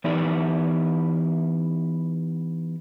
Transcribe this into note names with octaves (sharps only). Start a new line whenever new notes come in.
E3 B3 D#4 E4 G4 D5